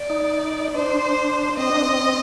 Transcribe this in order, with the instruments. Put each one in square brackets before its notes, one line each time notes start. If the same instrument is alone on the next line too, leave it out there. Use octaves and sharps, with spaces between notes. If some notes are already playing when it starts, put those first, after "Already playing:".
Already playing: [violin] D5
[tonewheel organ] D#4
[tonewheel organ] D4 [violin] C5
[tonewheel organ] C4 [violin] D#5
[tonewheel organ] D4
C4